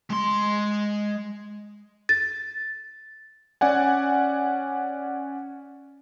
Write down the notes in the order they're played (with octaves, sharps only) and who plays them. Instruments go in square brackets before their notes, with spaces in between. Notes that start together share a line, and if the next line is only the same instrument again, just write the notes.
[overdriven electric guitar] G#3 C6
[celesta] A6
[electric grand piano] C#4 D5 F#5 G#5